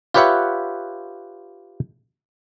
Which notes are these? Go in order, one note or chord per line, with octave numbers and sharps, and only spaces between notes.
F4 G4 B4 C#5 E5 F#5